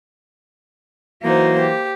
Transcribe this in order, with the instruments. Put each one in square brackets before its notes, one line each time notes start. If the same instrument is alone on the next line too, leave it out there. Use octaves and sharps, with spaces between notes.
[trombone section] E3 F#3 F#4 [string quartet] A#3 D#4 C5
[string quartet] G4